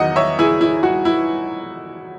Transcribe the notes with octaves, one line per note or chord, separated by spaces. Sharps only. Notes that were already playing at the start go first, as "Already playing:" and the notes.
Already playing: E2 D#3 F#3 D#5 F#5
C#5 E5
E4 G#4
E4
F#4
E4